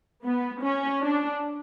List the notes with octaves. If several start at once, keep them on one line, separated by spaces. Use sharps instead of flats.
B3
C#4
D4